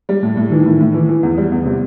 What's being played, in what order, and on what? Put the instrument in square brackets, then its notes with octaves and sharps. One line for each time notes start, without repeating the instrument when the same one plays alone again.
[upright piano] G3
A2
A2
[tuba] D#3 [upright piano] E3
[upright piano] A2
A2
E3
E3
E2
G3
E2
C3